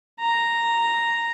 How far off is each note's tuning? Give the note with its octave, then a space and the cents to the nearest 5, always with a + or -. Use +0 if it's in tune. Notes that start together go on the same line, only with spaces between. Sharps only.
A#5 -5